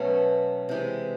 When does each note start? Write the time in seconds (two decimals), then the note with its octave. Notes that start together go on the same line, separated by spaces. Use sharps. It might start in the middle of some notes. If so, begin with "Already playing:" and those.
Already playing: B2 F#3 A3 C#4
0.69 C3 E3 G#3